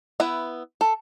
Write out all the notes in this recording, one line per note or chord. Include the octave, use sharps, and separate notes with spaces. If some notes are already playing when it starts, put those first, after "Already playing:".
B3 E4 B4 E5
A4